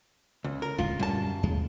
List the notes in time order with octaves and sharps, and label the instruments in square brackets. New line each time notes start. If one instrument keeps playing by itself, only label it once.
[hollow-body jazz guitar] C#2
A#4
[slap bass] D1 C#2 D3 [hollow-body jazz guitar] F4
[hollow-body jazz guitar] F#2 A5 [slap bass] A#2 G3
[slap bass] D#2 G#3